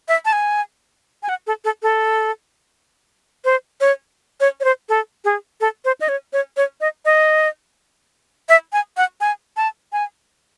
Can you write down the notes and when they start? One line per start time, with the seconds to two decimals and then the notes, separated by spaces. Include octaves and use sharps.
0.08 E5
0.25 A5
0.33 G#5
1.23 G#5
1.29 F#5
1.47 A4
1.65 A4
1.83 A4
3.45 C5
3.81 C#5
4.40 C#5
4.60 C#5
4.64 C5
4.89 A4
5.25 G#4
5.61 A4
5.85 C5
6.01 D#5
6.09 C#5
6.33 C#5
6.57 C#5
6.81 D#5
7.05 D#5
8.49 E5
8.73 G#5
8.97 F#5
9.21 G#5
9.57 A5
9.93 G#5